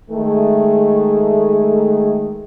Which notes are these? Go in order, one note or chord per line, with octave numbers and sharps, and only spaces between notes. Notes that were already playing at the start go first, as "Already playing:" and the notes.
D#3 G#3 A3